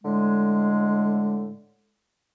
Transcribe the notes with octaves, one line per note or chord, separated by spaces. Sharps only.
A2 D3 G#3